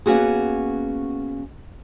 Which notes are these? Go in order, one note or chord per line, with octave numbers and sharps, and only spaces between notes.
A#3 B3 C#4 F#4 G#4